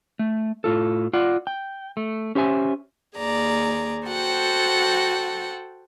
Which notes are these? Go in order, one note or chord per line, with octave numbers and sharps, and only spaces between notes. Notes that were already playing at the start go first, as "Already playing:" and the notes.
A3
A2 F4 A4
F4 D5 F#5
G5
A3
C#4 G4 C5 E5 G#5
D#2 G#4 D5 A#5
F#4 A4 C5 F#5 G5